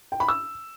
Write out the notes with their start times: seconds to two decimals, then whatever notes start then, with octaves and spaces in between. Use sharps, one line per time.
0.12 G5
0.20 B5
0.28 E6